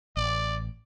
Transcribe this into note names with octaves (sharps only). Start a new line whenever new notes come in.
A1 D5